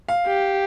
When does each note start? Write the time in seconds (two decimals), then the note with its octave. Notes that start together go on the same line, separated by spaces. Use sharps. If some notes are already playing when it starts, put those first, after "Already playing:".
0.08 F5
0.26 G4